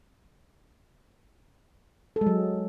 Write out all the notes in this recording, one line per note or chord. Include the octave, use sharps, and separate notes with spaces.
A4
G#3
F#3